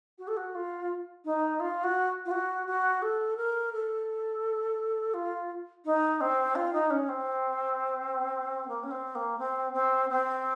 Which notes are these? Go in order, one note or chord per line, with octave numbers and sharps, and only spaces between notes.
F#4
A4
F#4
F4
D#4
F4
F#4
F4
F#4
F#4
A4
A#4
A4
F4
D#4
C4
F4
D#4
C#4
C4
A#3
C#4
C4
A#3
C4
C4
C4